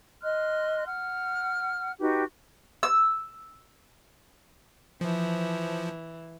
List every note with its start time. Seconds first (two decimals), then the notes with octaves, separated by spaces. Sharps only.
0.22 D#5 C6 F6 F#6
0.86 F#5 F6
1.99 D#4 F#4 G4 B4
2.83 E6
5.01 E3 F3